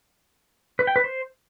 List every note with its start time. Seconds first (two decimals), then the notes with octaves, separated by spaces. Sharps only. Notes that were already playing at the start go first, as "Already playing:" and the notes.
0.79 B4
0.87 G5
0.96 B4
1.04 C5